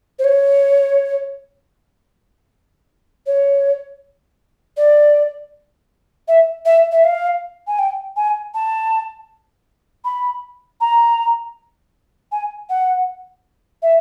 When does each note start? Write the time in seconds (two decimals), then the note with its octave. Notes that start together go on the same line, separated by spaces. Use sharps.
0.19 C5
0.24 C#5
3.26 C#5
4.77 D5
6.28 E5
6.65 E5
6.92 E5
7.04 F5
7.67 G#5
7.79 G5
8.16 G#5
8.54 A5
10.05 B5
10.81 A#5
12.32 G#5
12.69 F#5
13.82 E5